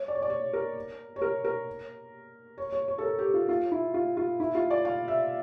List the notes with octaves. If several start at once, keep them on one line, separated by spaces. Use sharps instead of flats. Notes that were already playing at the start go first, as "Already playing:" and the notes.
Already playing: C#5
D5
C#5
D5
C#5
A#4
C#5
A#4
A#4
C#5
C#5
C#5
A4
A#4
G4
F4
F4
E4
F4
F4
E4
F4
D5
F5
E5